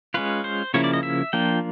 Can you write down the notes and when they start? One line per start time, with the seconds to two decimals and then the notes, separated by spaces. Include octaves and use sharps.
0.14 G#3 C#4 F4 B4
0.44 C5
0.74 C#3 F3 A#3 C#4 E4 C#5
0.84 D5
0.93 D#5
1.03 E5
1.33 F3 A#3 D4 F4 G5